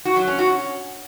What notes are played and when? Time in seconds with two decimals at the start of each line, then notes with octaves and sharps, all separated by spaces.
0.05 F#4
0.16 F#3
0.27 C#4
0.39 F#4
0.50 C#4